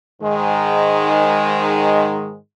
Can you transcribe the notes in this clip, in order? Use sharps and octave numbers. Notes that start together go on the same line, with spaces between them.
G#2 D#3 G#3